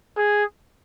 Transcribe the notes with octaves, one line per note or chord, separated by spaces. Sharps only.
G#4